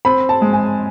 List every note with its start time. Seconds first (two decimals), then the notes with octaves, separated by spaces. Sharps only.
0.05 C4 B5
0.29 A5
0.42 G#3
0.53 G#5